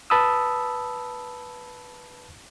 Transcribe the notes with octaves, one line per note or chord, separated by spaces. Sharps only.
B4 A5 B5 D#6 E6